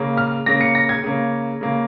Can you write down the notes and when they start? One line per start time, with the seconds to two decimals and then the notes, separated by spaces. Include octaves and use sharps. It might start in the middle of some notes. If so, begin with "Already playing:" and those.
Already playing: C#3 A#3 C#4
0.17 F6
0.46 C#3 A#3 C#4 A#6
0.61 C#7
0.75 A#6
0.89 G#6
1.04 C#3 A#3 C#4
1.61 C#3 A#3 C#4